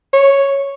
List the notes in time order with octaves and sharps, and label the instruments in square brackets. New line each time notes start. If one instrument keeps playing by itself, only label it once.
[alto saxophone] C#5